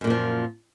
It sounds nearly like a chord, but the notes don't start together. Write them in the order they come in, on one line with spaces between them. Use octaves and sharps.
F#2 A#2 A#3 F3